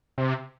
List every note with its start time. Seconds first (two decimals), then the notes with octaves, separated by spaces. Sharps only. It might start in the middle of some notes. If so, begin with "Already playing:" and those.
0.18 C3